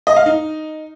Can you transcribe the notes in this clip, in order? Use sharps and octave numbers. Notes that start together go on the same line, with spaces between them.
D#5
F5
D#4